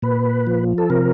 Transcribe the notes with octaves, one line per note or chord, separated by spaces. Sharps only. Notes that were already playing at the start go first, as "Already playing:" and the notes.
A#2 B4
F3
A4
C3 A#4